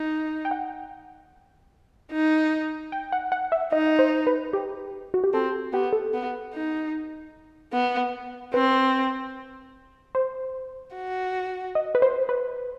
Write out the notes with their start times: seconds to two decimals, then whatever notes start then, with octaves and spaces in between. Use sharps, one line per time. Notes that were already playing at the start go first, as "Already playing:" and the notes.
Already playing: D#4
0.45 G5
0.51 F#5
2.12 D#4
2.92 G5
3.12 F#5
3.32 F#5
3.52 E5
3.72 D#4 D#5
3.99 C5
4.27 B4
4.53 G4
5.14 F#4
5.24 G4
5.33 C4 A4
5.73 B3 G4
5.93 A4
6.14 B3
6.54 D#4
7.73 B3
8.54 C4 B4
10.15 C5
10.94 F#4
11.75 D#5
11.95 B4
12.02 C5
12.29 B4